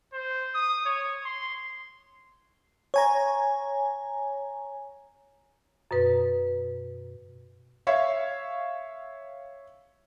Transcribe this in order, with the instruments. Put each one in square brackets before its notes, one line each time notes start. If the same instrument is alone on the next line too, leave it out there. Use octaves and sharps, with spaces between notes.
[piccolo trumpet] C5
D#6
C#5
C6
[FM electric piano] C#5 G#5 A#5
[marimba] F#2 B2 B4
[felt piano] C#5 E5 F5